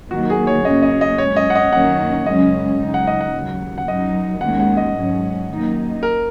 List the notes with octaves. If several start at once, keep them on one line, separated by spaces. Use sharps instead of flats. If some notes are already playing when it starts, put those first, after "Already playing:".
D#2 D#3 F#3 A#3 F#4
G#4
C#5
F#2 C#3 A#3 C#4 D#5
D#5
D#5
F#2 C#3 G#3 C#4 C#5
D#5
F#5
D#5
F#2 D#3 A#3 C#4 F#5
F#2 C#3 G#3 C#4 D#5
F#2 C#3 G#3 D#4
F#5
D#5
F#5
D#2 C#3 F#3
F#5
F#2 F#3 D#4 D#5
D#2 D#3 G#3 C#4 F#5
F#5
D#5
G#2 F#3 C#4
F#2 D#3 A#3 D#4
A#4